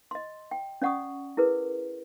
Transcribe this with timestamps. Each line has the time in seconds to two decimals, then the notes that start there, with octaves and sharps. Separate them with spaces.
0.11 D#5 C6
0.51 G5
0.82 C#4 D5 F#5 C#6 D#6
1.37 E4 G#4 A#4 B4